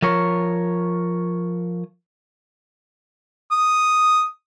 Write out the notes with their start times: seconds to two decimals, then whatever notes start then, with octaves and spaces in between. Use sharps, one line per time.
0.02 F3 A#4 C#5
3.51 D#6